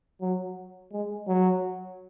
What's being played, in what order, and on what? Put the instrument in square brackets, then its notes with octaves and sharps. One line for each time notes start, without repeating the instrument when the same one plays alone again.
[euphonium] F#3
G#3
F#3